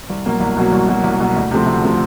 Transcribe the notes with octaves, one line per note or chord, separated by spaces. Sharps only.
C2
B2 F#3 A#3
C2
B2 F#3 A#3
C2
B2 F#3 A#3
C2
B2 F#3 A#3
D2
C3 F3 A3 C4
D2
C3 F3 A3 C4